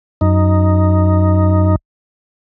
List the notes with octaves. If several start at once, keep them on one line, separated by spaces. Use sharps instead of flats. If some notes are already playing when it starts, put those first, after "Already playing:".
F#2 D#4